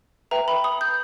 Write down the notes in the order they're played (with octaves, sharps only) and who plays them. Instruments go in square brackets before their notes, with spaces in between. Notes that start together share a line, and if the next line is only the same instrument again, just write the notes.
[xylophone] B4 E5 G5 A#5
B5
D#6
G6